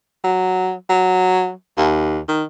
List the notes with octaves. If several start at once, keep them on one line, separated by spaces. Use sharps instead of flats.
F#3
F#3
D#2
D#3